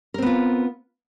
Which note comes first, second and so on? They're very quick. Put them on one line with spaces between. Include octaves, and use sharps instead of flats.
A#4 C4 B3 F4